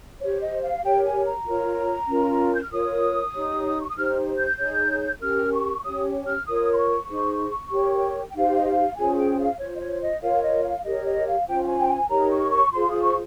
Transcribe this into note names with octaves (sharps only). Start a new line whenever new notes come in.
G4 C5 C#5
D#5
F5
G4 A#4 C#5 G5
G#5
A#5
F4 A#4 C#5
C#4 F4 A#4
G6
F6
F4 A#4 C#5 D#6
D#4 G4 C#5
C#6
D#6
D#4 G4 C5 F6
G6
D#4 G#4 C#5
C#4 G4 A#4 F6
C#6
C#4 G4 C#5 D#6
F6
F4 A#4 C#5 D#6
C6
C#6
D#4 G#4 C5
G4 A#4 C#5
G5
D#4 G4 C5 F5
D#5
F5
C#4 F4 G#4 C5 G#5
G5
F5
F4 C5 C#5
D#5
C#5
D#5
F4 A#4 C#5 F5
D#5
F5
G4 A#4 C#5 D#5
D#5
F5
C#4 F4 C5 G5
G5
G#5
G5
G#5
D#4 G4 A#4 C#5 A#5
C#6
C#6
F4 G#4 C5 C6
D#6
C#6